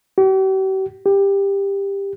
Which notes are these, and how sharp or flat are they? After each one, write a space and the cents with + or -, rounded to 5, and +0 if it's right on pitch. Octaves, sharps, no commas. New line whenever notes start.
G4 -45
G4 +15